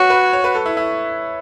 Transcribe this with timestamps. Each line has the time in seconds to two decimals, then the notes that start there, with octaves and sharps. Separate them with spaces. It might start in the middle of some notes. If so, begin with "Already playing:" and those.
Already playing: F#4 B4 C#5
0.10 B4
0.33 C#5
0.44 B4
0.55 A4
0.66 E4
0.77 E4